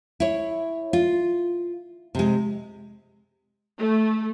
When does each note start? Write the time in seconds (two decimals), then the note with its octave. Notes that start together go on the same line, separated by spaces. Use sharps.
0.20 E4 C#5
0.93 F4
2.15 C3 G#3
3.79 A3